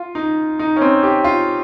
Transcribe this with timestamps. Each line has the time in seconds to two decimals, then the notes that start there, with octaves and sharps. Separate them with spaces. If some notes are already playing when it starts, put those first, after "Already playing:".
Already playing: F4
0.15 D#4
0.59 D#4
0.76 C#4
0.81 C4
1.03 G4
1.24 F4